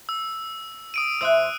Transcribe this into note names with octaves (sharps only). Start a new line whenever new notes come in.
E6
D#6 D7 D#7
E2 C5 E5 E6 F#6